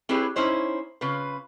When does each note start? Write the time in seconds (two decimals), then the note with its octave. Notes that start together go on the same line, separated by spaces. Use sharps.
0.09 C4 E4 G4 G#4 B4 C#5
0.36 C#4 D#4 E4 C5 C#5
1.01 C#3 F4 B4